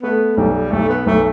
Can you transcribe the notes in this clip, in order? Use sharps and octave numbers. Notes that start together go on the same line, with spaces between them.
A3 B3
B1 G3
B1 A3
B3
B1 A3